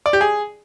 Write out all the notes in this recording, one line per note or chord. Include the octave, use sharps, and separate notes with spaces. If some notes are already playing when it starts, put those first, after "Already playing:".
D5
G4
G#4